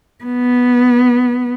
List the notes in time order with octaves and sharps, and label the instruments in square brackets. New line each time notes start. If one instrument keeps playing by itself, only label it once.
[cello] B3